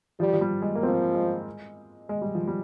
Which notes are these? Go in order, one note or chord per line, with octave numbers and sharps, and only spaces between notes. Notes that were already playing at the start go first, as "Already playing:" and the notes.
F3 G3
F3
G3
G#3
A#3
F3 C4
G#3
G#3
G3
F3
G3